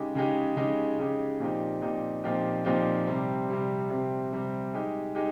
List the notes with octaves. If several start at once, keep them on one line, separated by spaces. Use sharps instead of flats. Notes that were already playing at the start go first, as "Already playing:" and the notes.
Already playing: C#3 G#3 D#4 G4
C#3 G#3 D#4 G4
C#3 G#3 D#4 G4
C#3 G#3 D#4 G4
A#2 F3 C4 D#4 G4
A#2 F3 C4 D#4 G4
A#2 F3 C4 D#4 G4
A#2 F3 C4 D#4 G4
C3 G3 C4
C3 G3 C4
C3 G3 C4
C3 G3 C4
G#3 D#4 G4
G#3 D#4 G4